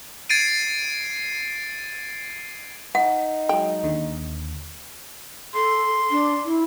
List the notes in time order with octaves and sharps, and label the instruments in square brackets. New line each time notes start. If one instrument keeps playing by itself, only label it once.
[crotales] G#6 A6 C7 D7 D#7
[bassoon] D#4 [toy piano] F#5
[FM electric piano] F#3 G#3 [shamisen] G5
[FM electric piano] D#2 D3
[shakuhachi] A4 [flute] C6
[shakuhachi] D4
E4